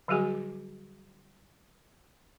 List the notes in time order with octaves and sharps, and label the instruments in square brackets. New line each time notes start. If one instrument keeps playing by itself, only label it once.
[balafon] D3 F#3 G3 F#4 G#4 G#5